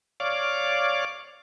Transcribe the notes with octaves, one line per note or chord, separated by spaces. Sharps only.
C#5 D5 F5 D6